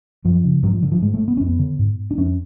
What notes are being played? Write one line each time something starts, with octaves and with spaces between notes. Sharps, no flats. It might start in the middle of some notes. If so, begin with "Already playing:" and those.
F#2 F3
C#3
G#2 F#3
F3
D3
F3
G#2 G#3
A3
B3
F2 C#4
B3
D3
G#2
D4
F2 C#4